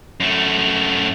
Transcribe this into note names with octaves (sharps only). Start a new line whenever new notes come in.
F#2 A3